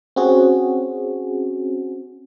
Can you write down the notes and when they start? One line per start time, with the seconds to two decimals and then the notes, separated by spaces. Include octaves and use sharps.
0.16 C4 C#4 F#4 G#4